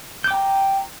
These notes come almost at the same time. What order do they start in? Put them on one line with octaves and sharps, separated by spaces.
G6 D6 G5 A#5